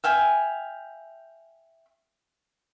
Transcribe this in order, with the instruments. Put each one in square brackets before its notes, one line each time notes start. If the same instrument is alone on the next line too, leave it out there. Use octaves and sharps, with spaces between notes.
[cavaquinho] E5 F5 G5 G#5